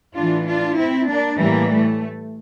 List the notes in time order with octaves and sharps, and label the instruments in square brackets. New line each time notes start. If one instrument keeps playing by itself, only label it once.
[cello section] A2 E3 D4 F4
D4 F4
C4 E4
A#3 D4
A2 E3 G3 A#3
A3